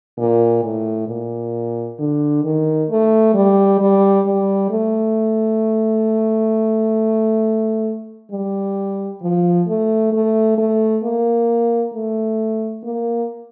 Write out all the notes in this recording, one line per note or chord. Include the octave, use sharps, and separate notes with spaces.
A#2
A2
A#2
D3
D#3
A3
G3
G3
G3
A3
G3
F3
A3
A3
A3
A#3
A3
A#3